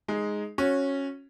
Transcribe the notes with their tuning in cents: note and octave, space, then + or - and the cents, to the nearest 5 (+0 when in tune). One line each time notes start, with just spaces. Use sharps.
G#3 +0 D#4 +0 G#4 +0
C#4 -10 F#4 -20